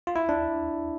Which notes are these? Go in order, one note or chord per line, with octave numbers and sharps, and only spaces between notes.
F4
E4
D4